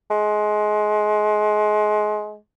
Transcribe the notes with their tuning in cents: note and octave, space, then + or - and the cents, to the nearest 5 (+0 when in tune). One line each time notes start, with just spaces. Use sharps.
G#3 +25